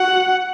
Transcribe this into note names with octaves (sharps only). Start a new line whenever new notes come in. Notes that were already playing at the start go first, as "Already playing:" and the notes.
Already playing: F#4 F#5